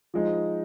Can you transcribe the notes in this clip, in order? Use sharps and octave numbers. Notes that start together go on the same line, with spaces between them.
F3 G#3 D#4